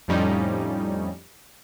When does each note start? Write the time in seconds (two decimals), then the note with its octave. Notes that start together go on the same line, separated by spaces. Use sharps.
0.08 F2 A2 F3 G3 C#4 D#4